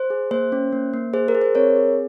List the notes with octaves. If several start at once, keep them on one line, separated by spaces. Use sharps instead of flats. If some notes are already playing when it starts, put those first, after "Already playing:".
Already playing: C5
G#4
A#3 C5
C#4
A#3
A#3
G#4 C5
A#4
G#4
C5
C4 A#4 C#5
G#4